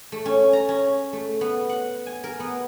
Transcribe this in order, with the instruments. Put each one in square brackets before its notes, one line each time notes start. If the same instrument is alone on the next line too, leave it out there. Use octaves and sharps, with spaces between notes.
[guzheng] A3
C#4
A#5
C#4
A3
B3
F#5
G#5
A#4
B3